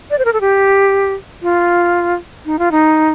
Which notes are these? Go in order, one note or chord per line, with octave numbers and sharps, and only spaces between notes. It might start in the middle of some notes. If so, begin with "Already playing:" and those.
D5
C5
A#4
A4
G4
F4
D#4
F4
D#4